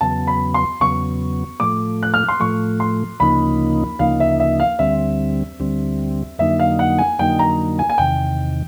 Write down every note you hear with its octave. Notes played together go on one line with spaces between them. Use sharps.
E2 C#3 F#3 B3 A5
B5
C6
E2 C#3 F#3 B3 C#6
A2 F3 A3 D6
F#6
F6
C6
A2 F3 A3 C#6
C6
D2 C#3 F3 A#3 D#4 B5
D2 C#3 F3 A#3 D#4 F5
E5
E5
F5
D2 D3 G3 C4 E5
D2 D3 G3 C4
F2 D3 F#3 A#3 D#4 E5
F5
F#5
G#5
F2 D3 F#3 A#3 D#4 G5
A#5
G#5
G#5
E2 C3 D#3 G5